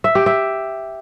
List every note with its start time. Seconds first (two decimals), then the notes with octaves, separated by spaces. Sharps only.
0.04 E5
0.15 G4
0.26 E5